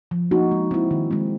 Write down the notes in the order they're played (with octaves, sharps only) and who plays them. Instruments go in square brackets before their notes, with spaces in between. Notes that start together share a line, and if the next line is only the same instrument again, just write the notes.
[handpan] F3
A#3 D#4 F#4
G#3
C4 E4
D#3
G#3 C4